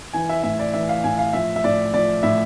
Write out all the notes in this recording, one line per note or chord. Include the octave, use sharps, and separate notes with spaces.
E3 G#5
E5
A2 E5
D5
E3 E5
F5
A2 G#5
F5
F3 E5
E5
A2 D5
F3 D5
A2 E5